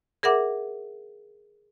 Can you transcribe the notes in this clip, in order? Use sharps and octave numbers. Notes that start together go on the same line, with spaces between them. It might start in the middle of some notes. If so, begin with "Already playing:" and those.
G#4 A#4 E5 F#5 D6